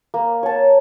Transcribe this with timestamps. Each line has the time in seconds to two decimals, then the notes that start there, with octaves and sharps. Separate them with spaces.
0.14 A#3
0.43 C#5 A5